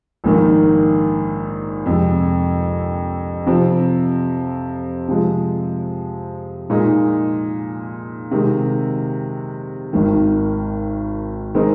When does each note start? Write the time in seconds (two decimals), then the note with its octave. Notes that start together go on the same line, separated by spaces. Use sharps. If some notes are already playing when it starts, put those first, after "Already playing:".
0.24 A#1 G#2 D#3 A#3
1.86 F2 C3 G#3
3.46 C3 F3 C4
5.08 C3 F3 G#3
6.70 A#2 G#3 D#4
8.31 C3 D#3 G#3
9.93 G#1 G#2 D#3
11.54 D#3 G#3 C4 D#4 A#4